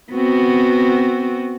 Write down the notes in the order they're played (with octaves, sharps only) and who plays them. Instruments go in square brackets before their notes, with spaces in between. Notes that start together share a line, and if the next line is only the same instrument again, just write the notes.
[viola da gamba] B3 C4 F#4